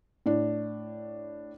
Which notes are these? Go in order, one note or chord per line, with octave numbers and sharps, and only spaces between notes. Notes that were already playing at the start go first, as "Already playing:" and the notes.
A2 D4